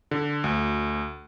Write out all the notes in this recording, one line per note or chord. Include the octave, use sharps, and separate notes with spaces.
D3
D2